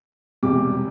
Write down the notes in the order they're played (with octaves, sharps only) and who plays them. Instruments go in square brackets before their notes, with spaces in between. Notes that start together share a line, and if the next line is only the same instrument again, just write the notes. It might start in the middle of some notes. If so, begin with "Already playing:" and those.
[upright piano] E1 E2 C3 G3 D6